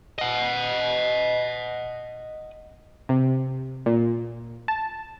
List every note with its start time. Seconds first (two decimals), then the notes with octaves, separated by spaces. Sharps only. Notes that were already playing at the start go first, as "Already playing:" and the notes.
0.19 D#5 F#5
3.09 C3
3.86 A#2
4.68 A5